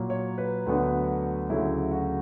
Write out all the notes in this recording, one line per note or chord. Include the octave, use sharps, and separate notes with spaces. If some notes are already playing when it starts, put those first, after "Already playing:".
Already playing: A#2 F#3 A#3
C#5
B4
D2 D3 F#3 B3 D4
D2 C#3 F#3 E4
F#4